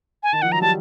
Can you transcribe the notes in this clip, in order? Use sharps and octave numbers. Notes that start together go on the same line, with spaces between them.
G#5
D#3 A5
F3 F#5
F#3 A#5
G3 A5